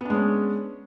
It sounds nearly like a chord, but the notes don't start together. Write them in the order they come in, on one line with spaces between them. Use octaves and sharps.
B3 D4 G#3 C#4